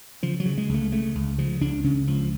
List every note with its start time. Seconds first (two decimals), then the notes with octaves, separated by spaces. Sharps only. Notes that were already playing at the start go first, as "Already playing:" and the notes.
0.23 C#3 F3
0.40 F#3
0.45 C#3
0.58 G#3
0.69 C#2
0.74 A3
0.92 C#3 A3
1.15 C#2
1.38 C#3 F3
1.61 C#2 D4
1.84 C#3 C#4
2.07 C#2 F3